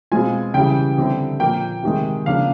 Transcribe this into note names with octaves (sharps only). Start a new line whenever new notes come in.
B2 G#3 C4 F4 G#5
C#3 E3 G3 G5
D3 G3 C4 E4
A#2 F3 A#3 G5
C3 D#3 G#3
C#3 F3 A#3 D4 F5